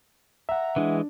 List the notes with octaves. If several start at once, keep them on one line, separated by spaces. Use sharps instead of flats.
E5 F#5 A#5
E3 G#3 D4